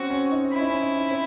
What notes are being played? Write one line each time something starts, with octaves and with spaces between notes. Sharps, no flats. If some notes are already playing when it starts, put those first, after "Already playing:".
Already playing: C4 C#4 F#4
C#4
D#4
C#4 E4
D#4
C#4
D#4
D#4
C4